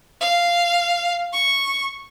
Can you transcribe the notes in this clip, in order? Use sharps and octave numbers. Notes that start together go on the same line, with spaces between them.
F5
C#6